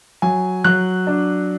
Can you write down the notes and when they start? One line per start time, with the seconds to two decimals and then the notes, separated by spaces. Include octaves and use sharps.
0.22 F#3 G#5
0.64 F#3 F#6
1.07 D4